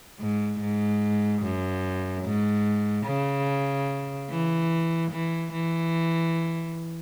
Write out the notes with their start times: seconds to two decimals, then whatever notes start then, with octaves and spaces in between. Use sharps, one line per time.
0.19 G#2
0.60 G#2
1.43 F#2
2.25 G#2
3.07 C#3
4.30 E3
5.11 E3
5.53 E3